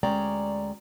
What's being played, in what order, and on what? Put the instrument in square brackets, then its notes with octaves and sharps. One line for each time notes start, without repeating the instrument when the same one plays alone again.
[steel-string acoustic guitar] D2 G#3 C#4 D5 G5 A#5